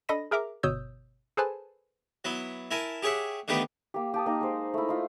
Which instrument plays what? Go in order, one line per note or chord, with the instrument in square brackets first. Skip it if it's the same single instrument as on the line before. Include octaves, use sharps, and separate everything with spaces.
[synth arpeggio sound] D4 A4 D#5 B5 A#6 D#7
G#4 A#4 E5 A#5 D6
G1 B2 C#5 D#6 E6 G6
G#4 A4 B4 C5 G#5 A5
[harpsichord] F#3 B3 E4
E4 A#4 G#5 A5
G4 G#4 C#5 E5 F#5
D3 D#3 A3 B3 G4 B4
[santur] A#3 G4
G4 A5 D#6
A#3 D#4 A#5
G#3 C5
A3 E4
D#4 F4